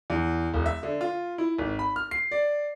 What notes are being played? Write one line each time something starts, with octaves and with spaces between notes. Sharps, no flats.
E2
E1
E5
D3
F4
E4
G#1
B5
F6
C7
D5